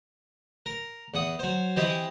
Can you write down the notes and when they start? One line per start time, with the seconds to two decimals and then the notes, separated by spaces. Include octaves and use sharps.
0.66 A#4
1.14 E2 F#5 D#6
1.39 F#3 C5
1.76 E3 C4 E4 G4 D#5